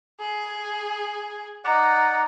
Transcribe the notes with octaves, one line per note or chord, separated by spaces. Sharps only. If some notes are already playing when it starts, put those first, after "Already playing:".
G#4
D#4 D5 F#5